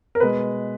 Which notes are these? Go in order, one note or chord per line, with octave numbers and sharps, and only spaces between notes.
A#4
B2 G#3 B4